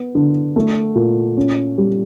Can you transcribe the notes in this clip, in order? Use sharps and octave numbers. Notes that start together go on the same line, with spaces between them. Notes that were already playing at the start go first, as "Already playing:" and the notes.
Already playing: B3
D3
A3
A#2
C#4
G3